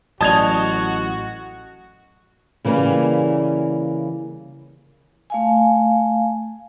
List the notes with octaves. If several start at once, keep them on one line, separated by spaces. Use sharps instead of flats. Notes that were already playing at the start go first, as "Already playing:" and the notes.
A1 F#3 F#4 D#5 A5 G#6 F7
C#3 E3 G3 A#3
A3 F5 G#5